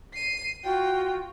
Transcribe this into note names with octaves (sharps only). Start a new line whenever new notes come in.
C7 D#7
F4 F#4 G5